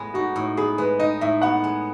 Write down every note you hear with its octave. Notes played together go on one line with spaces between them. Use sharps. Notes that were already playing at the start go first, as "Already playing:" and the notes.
Already playing: A2 G#3 B3
D#4 F#4
A2
B3 G#4
G#3 B4
D#4 D#5
A2 E5
B3 F#5
G#3